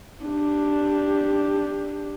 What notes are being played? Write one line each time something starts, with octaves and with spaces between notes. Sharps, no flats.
D4 G4